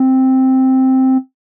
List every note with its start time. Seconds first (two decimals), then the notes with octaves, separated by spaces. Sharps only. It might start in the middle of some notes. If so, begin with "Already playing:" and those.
Already playing: C4